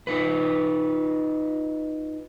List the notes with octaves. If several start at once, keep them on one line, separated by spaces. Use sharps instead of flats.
D#4 F4 B4